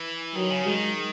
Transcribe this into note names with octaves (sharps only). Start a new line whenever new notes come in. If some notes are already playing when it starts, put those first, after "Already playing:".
Already playing: E3
D#3 F#3
C#3
D#3 G#3